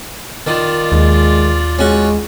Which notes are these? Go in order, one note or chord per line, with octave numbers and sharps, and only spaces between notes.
D#3 F4 D5
D#2 G#3
G#3 C#4 F#4